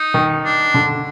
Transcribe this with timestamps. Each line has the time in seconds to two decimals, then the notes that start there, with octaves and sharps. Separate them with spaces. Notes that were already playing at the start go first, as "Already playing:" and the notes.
Already playing: D#4
0.14 D#3
0.45 D4
0.74 D3